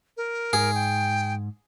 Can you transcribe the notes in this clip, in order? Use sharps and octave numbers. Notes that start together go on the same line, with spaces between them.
A#4
G#2 G#4
G5